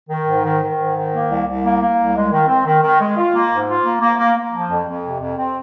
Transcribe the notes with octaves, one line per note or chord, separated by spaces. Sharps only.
D#3
G#2
D#3
D#3
G#2
D#3
A#3
C2
C2
A#3
A#3
C2
G#3
D#3
C4
D#3
D#3
G#3
F4
A#3
G#2
F4
A#3
A#3
A#3
A#3
F3
F2
F2
C3
F2
C4